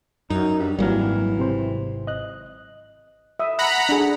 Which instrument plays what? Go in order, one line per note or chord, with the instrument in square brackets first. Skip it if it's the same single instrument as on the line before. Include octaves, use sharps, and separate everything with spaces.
[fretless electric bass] F#2 [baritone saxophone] D#4
[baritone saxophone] G2
[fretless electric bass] G#1 F#3 [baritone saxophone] E3 [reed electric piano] G3 A#3 F6
[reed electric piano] C2 C3 C5
D#5 F#6
[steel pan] E5 D#6
[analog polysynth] F#5 A#5 B5
[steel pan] D4 G#4